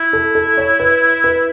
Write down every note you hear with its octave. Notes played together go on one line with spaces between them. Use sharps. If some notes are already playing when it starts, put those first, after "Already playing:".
Already playing: E4
A4
A4
C#5
B4
B4